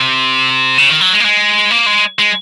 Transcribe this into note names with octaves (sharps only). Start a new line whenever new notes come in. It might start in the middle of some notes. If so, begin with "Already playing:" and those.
Already playing: C3
C#3
D#3
F#3
G#3
A#3
G#3
A#3
G#3
G#3